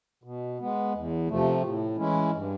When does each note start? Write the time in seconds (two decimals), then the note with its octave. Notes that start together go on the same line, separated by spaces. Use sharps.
0.23 B2
0.59 G#3 B3
0.93 E2
1.28 C3 F3 A3
1.62 A2
1.96 E3 G#3 C#4 E4
2.32 G2